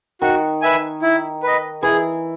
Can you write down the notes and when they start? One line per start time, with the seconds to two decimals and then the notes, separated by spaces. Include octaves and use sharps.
0.21 D#3 F#4
0.62 B4 E5 G#5
1.02 E4
1.43 B4 D#5
1.83 E3 G#4